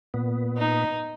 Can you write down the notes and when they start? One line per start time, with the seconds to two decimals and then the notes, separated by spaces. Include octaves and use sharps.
0.14 A#2 B3
0.57 D#4